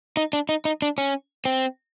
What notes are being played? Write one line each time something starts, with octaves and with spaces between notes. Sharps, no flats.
D#4
D4
D#4
D#4
D4
C#4
C4